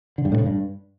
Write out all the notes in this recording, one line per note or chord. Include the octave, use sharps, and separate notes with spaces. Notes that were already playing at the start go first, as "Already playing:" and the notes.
D3
G2
A2
C#3
G2